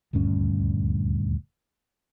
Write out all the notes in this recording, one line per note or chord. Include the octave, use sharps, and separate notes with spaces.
D#1 D2 G2 C#4